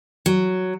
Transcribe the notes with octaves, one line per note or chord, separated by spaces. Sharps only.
F#3